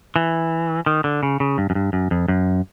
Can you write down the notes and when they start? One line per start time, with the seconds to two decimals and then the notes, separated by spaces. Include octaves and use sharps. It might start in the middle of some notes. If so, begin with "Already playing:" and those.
0.16 E3
0.86 D#3
1.04 D3
1.23 C#3
1.40 C#3
1.58 G2
1.70 F#2
1.75 G2
1.93 F#2
2.11 F2
2.28 F#2